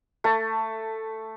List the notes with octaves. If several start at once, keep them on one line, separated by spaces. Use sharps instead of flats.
A3 A5